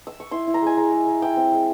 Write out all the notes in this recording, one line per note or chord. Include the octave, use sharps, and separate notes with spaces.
E6
C#6
E4 C6
E4
A#5
G#3 G#5
G#3 A#5
G#3
G#3
E4 G5
C4
G#3